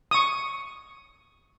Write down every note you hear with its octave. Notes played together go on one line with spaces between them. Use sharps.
C#6 D#6